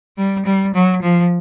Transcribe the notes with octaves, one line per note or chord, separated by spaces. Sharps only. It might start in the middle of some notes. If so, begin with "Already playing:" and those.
G3
G3
F#3
F3